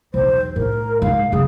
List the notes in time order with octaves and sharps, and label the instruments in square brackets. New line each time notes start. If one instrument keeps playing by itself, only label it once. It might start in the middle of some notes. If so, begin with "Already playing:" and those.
[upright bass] B1 E2 [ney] C5
[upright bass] A2 [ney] A#4
[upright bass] G#2 [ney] F5
[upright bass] F#2 C#3 [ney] G#4